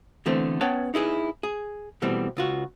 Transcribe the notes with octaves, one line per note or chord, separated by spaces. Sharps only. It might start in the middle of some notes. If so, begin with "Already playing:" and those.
D3 E3 A3 B3 C4
B3 C#4 B4 C#5 G5 A5
D#4 E4 G#4 B4
G#4
B2 E3 G3 A3 C4
C#2 F4 F#4